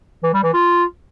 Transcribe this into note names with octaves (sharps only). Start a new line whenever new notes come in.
E3
G3
E3
F4